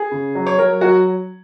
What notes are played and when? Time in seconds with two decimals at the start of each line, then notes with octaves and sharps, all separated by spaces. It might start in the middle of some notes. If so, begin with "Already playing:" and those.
Already playing: G#4
0.11 C#3
0.35 F#3
0.47 C#5
0.58 F#3 A#4
0.81 F#3 F#4